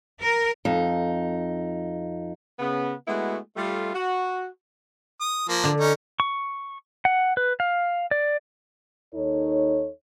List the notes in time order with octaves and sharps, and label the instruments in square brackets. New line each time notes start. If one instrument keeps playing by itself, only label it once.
[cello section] A#4
[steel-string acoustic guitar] F2 D#4
[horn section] C#3 B3
G#3 A3 B3 E4 F#4
G3 A3 F4
F#4
[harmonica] D#6
F3 A#3
[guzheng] D3 D4
[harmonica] C#4 D#4
[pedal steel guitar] C#6
F#5
B4
F5
D5
[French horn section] D#2 D#4 A4 C#5